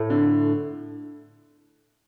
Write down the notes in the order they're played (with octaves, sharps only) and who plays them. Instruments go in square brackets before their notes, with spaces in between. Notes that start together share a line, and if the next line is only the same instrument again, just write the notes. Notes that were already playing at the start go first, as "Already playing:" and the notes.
Already playing: [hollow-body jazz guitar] A2 A3
[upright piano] D3